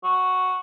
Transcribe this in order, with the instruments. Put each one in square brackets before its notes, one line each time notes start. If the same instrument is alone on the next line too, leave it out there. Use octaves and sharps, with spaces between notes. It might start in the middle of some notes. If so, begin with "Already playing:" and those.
[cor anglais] F#4